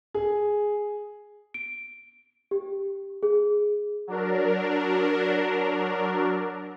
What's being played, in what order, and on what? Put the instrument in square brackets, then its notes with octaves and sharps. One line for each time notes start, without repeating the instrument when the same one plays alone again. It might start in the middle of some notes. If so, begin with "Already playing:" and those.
[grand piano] G#4
[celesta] D7
G4
G#4
[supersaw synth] F#3 D4 A#4